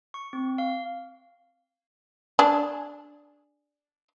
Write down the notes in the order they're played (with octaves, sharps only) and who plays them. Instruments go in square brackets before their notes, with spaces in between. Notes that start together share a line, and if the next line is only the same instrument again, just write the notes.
[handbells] C#6
C4
F5
[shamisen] D4 G#4